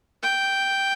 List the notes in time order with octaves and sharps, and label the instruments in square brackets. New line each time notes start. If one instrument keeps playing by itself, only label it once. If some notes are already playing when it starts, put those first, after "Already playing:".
[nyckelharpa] G5